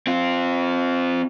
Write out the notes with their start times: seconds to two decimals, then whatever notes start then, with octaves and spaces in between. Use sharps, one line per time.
0.07 C4 F4